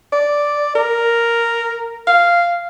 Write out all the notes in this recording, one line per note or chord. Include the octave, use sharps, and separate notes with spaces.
D5
A#4
F5